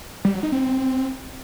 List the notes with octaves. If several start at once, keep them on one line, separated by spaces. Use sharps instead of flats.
G3
F#3
D#4
C4